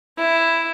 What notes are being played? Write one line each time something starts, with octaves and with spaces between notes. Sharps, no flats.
E4